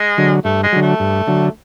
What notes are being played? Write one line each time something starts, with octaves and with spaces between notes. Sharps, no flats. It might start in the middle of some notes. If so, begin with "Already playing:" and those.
Already playing: G#3
D3 F#3
G2 A3
G#3
D3 F#3
A3
G2
D3 F#3